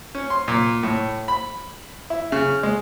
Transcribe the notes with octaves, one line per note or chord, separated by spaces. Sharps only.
C#4
C6
A#2
A2
B5
E4
C#3
G#3